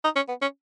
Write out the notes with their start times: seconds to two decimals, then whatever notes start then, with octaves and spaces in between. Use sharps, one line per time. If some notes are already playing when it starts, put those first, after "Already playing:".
0.04 D#4
0.16 C#4
0.29 B3
0.42 C#4